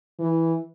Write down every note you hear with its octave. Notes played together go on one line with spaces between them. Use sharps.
E3